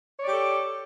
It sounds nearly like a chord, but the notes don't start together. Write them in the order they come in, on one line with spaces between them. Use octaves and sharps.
C#5 D5 G4 A4